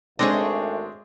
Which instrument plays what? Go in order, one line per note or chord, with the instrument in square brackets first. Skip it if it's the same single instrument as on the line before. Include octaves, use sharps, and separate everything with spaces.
[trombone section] G#1 A3 [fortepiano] G#3 C4 D4 [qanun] G#4 C#5 D#5